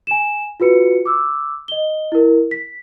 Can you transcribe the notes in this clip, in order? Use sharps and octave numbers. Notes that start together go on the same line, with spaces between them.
G#5 E7
F4 F#4 B4 C#7
D6 E6
D#5 G7
E4 A#4
B6